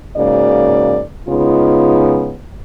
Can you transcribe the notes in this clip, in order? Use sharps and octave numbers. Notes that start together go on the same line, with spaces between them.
G#2 C#3 A#3 F#4 D5
C#3 G#3 B3 D#4 F4